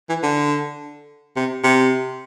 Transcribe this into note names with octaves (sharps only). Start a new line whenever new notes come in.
E3
D3
C3
C3